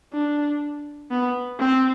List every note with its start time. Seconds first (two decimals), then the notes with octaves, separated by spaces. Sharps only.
0.13 D4
1.11 B3
1.59 C4